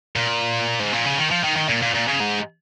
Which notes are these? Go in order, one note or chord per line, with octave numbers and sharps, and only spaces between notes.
A#2
G#2
A#2
C#3
D#3
F3
D#3
D#3
A#2
A#2
A#2
C#3
G#2